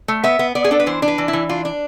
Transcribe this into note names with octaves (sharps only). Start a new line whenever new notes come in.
A3
B3 E5
B3
B3 D5
G#4
D4 A4
B4
E3 C5
D4
B4
E3
E4
E3
D4 F4
D4